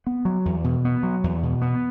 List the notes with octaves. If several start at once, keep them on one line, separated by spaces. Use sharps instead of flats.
B3
F#3
E2
B2
B3
F#3
E2
B2
B3